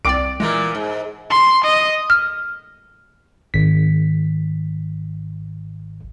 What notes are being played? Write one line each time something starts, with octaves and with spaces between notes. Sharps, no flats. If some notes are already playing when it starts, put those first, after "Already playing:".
C2 C4 D5 D6 D7
A#2 E3 G#3 A#4
G#2
C6
D#5
F6
G#1 B6